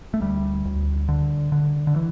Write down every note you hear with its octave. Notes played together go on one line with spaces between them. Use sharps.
A3
D2 G3
D2
D3
D3
D3
E3